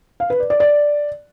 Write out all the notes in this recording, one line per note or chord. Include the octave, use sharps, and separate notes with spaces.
F5
B4
D5
D5
D5